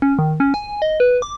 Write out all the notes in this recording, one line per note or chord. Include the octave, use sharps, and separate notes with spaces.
C#4
D#3
C#4
G#5
D#5
B4
D6